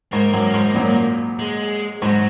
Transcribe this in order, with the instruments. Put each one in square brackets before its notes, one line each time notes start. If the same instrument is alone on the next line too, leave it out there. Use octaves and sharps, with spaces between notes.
[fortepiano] G#2 [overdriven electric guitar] A#3
[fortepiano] F#2
G#2
F#2 A#2
[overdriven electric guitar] G#3
[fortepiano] G#2 [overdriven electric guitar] F#3